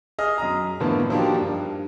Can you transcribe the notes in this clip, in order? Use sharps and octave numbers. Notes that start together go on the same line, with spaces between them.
G#4 D#5 F6
F#2 D#5 A#5
A2 D3 F3 A#3 B3
F3 A#3 D4 D#4 F#4 G4
G2